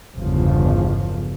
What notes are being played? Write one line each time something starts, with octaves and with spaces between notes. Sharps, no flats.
G1 E2 C#3 F3